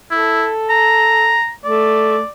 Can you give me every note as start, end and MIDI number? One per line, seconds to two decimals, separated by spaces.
0.11 0.49 64
0.11 1.36 69
0.70 1.51 82
1.64 2.19 57
1.64 2.29 74